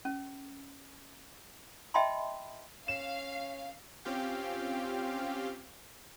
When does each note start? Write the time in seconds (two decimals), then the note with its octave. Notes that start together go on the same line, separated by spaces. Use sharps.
0.05 C#4
1.94 D#5 E5 G5 A5 B5 C6
2.88 C#4 F5 E7
4.05 C4 C#4 F4 G4 F5 G5